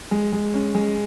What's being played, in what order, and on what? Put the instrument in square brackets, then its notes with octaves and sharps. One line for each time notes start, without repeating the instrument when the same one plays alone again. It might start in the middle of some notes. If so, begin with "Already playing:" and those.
[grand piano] G#3
G#3
C#4
G#3